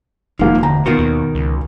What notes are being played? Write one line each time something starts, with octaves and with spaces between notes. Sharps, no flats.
E1 D#3 F3 A#3 F#4
D2 A#5
B2 D#3 F4 F#4
D#2
C#2